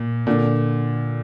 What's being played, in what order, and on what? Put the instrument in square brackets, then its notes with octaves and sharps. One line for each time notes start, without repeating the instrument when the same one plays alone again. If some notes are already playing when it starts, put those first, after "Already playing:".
Already playing: [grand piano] A#2
A#2 D3